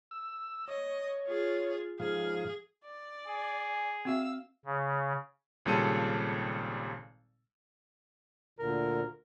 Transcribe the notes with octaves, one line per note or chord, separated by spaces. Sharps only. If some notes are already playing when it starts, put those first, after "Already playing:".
E6
C#5 D#5
F4 G#4
G#2 F3 G#4 F5
D5
G#4 G#5
C4 F#4 E5 F5 E6
C#3
G#1 A#2 C#3 G3 A4 D#7
D2 A#2 D3 A#4